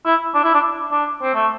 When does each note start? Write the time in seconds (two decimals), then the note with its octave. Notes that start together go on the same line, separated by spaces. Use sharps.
0.06 E4
0.34 D4
0.44 E4
0.54 D4
0.92 D4
1.22 C4
1.34 A3